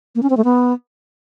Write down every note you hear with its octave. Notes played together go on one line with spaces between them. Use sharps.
A#3
C#4
C4
A3
B3